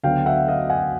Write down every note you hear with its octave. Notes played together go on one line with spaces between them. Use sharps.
D2 D3 F#3 B3 F5 G5
E5 F#5
D#5 F5
F#5 G#5